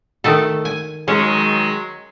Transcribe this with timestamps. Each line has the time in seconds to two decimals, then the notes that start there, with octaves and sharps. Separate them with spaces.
0.24 D#3 A3 A4
0.65 G#5
1.08 D#3 F#3 G#3 C#4